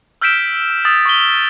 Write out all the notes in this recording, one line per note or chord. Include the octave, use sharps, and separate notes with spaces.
E6 F6 G6 B6 D7 E7
D#6 E6 A6
C#6 B6 G7